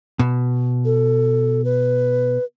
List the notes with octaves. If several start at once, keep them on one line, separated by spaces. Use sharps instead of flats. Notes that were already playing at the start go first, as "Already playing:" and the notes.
B2
A4
B4